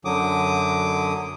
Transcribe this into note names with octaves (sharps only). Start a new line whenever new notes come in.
F#2 D3 F#3 D6 D#6